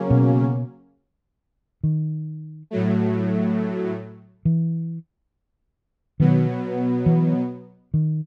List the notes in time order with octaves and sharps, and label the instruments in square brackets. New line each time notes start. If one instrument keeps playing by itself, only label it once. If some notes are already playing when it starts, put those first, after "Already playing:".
Already playing: [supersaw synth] C#3 F#3 A#3 C#4
[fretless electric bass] B2
D#3
[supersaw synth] A2 F#3 A3
[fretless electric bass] E3
[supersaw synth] B2 F#3 B3 [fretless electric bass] D#3
[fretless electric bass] E3
D#3